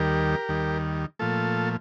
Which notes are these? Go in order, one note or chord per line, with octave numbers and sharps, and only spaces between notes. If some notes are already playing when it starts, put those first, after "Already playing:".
Already playing: D#2 D#3 G3 G4 A#4
D#2 D#3 G3
A#2 F3 A3 F4 A4